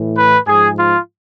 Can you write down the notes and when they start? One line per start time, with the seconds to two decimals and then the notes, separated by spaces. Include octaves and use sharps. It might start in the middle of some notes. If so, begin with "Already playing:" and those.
Already playing: A2 E3
0.17 B4
0.47 G#2 F3 G#4
0.77 F4